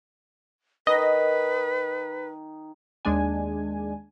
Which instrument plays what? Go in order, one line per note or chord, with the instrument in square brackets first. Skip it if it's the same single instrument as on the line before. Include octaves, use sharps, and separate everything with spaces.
[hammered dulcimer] D#3 D#4 [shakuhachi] B4 [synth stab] D#5
[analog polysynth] D#2 G#3 D4 G#5